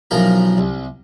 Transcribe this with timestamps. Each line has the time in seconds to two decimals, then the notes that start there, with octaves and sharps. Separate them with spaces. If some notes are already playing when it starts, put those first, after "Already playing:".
0.11 B1 E3 F3 A#4 A#5
0.58 C2